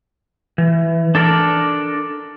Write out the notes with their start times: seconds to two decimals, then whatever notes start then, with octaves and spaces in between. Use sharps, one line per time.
0.58 E3
1.15 D4 A4 A#4 D5